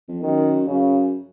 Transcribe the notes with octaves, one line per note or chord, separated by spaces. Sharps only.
F2
F#2 D#3
F#2 C#3